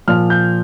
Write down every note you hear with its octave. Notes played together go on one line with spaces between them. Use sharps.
A#2 F3 F6
G6